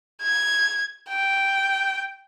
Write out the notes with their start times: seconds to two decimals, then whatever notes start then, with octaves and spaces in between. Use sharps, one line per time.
0.22 G#6
1.10 G5